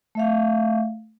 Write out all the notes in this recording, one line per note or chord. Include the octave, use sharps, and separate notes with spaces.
A3 E5 F5